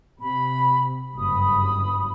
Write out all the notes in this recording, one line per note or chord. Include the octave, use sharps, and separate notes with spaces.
C3 B5
F#1 G2 B5 D#6